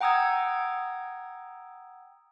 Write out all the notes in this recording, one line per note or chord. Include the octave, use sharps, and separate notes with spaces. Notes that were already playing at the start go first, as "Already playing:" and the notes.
F#5 G5 A#5 D#6 E6 G#6